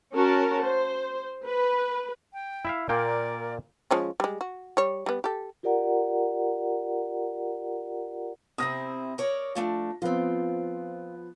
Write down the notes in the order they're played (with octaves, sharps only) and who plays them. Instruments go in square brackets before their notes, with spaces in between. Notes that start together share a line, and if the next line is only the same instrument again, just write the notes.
[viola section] C#4 F#4 A#4 A5
C5
B4
[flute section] G5
[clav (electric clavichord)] E4 E5 F5
[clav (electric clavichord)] A#2 A#3 G5 [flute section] A#4 D5
[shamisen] F3 G#3 C#4
G3 G#3
F#4
G3 C#5
G3 B3
G4 A4
[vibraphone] F4 G4 A#4 D5 F#5 A#5
[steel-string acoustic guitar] C3 C4 E4 [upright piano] D#6 A#6
[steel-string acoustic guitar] A#4 C#5 D5
F3 A3 D4
[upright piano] F3 B3 [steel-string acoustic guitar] C4 F4